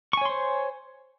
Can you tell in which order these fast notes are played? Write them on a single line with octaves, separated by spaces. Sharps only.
C#6 G#5 C#5 C6 C5